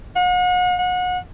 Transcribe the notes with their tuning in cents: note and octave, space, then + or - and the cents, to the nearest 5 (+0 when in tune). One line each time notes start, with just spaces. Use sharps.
F#5 -40
F#5 -30